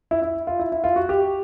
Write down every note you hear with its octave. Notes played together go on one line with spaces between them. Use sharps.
E4
E4
F4
E4
E4
F4
F#4
G4